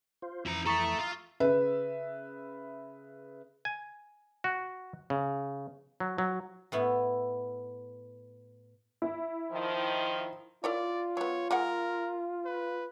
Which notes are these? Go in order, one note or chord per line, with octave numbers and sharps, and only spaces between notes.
F4 C5
F2 E3 E4 A#5
A4 E5 A#5 C#6 D#6
F4 E5
C#3 B4 E5
G#5
F#4
C#3
F#3
F#3
A2 B3 E4
E4
D#3 F3
E4 F4 A#4 C#5 D5
F#3 B3 C#5
G#3 G#4 A#4 F#5
B4